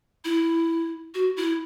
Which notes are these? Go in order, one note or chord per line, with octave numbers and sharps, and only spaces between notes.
E4
F#4
E4